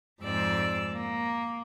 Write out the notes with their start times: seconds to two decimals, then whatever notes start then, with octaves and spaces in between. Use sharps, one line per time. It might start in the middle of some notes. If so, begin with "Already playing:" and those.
0.20 F2 G#2 G#3 C4 D5 E6
0.92 A#3